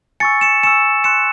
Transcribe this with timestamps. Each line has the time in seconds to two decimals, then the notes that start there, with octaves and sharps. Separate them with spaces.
0.20 G#5 C#6 E6 A6 C#7
0.41 C#7 E7
0.63 G#5 C#6 E6 C#7 E7
1.04 C6 F#6 C#7 E7